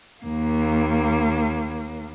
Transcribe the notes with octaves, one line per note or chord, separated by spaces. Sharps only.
D#2 A#3